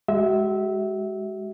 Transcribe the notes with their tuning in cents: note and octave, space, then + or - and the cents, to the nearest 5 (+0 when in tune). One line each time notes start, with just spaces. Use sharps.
G#3 +0 F#4 +40 E5 -15